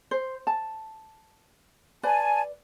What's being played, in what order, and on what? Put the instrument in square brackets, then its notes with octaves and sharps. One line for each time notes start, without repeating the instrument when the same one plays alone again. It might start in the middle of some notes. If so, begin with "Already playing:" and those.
[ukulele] C5
A5
[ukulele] B4 D5 [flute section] G#5 A5